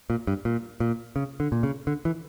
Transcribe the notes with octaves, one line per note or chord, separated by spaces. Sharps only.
A#2
G2
A#2
A#2
C#3
D3
A#2
C#3
D3
E3